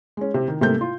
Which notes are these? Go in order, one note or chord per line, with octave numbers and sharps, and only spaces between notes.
G#3 C#4
C3
D#3
G#2 C3 G3 A3 A#3 G6
F4